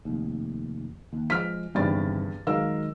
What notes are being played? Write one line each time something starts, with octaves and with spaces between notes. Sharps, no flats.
F1 D#2
D#2
F3 G#3 F6 B6
G1 E2 G2 C3 D#3 A6
D#3 F#3 G#3 A#4 F5 E6